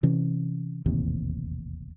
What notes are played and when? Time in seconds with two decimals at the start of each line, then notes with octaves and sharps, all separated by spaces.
0.03 C3 E3 C#4
0.86 E1 A1 D#2 C3